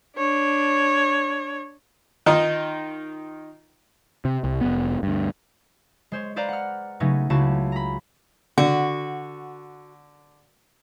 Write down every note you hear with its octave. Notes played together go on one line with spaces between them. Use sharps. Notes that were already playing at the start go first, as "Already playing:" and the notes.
D4 C#5
D#3 D#4 F4
C3
C2
F1 B3
D2 G2
G#3 C5 C#5
B4 C5 D5 F5 A#5
F#5 F6
C#3 F#3 A3 C#4 D#4 B4
C#2 C#3 E4 F#4 A5
A#5 B5
D3 F#4